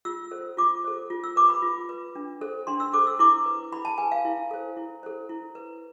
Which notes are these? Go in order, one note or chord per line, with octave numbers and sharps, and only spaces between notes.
F4 E6
A4 C5
F4 D6
A4 C5
F4
E6
B4 D6
B5
F4
B4
D4
A4 C5
D4 C6
E6
A4 C5 D6
E6
E4 D6
B4
E4 B5
A5
B4 G#5
F5
E4
A4 C5
E4
A4 C5
E4
B4